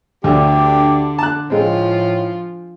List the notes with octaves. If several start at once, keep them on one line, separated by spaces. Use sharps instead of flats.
D2 D3 D4 G4
A5 F#6
A2 F3 G#3 C4 F4